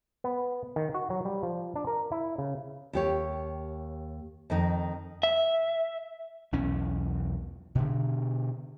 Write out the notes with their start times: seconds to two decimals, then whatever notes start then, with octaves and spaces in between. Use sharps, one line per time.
0.24 B3
0.76 D#3
0.94 F#4
1.10 F#3
1.25 G3
1.43 F3
1.76 D4
1.87 A#4
2.12 E4
2.38 C#3
2.93 D#2 G4 C#5
4.50 F2 D#3 D#4
5.23 E5
6.52 B1 E2 C#4
7.75 B2 D3